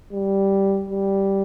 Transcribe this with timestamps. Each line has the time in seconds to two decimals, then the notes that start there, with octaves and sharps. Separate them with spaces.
0.13 G3
0.91 G3